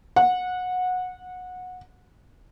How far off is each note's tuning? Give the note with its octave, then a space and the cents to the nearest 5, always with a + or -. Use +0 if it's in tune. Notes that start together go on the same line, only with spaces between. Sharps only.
F#5 -20